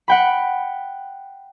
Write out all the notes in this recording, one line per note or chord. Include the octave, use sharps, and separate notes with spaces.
F#5 G5 B5